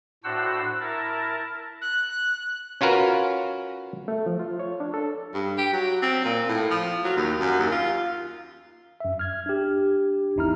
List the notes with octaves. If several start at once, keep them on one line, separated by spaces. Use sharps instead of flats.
A2 D4 F#4 C5 F#5 E6
E4 A#4 A5
F#6
C#4 F4 F#4 A#4 B4
A3
F3
F4
C#5
D4
A4
G2
G4
F#3
C4
A#2
A2
F3
F#3
D#2
F#2
D#2
F4
F#2 E5
F6 G#6
D4 G4
G#1 E2 D#4 E4 A#5 F6